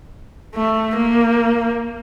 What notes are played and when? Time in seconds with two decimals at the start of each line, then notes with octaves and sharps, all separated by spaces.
0.55 A3
0.96 A#3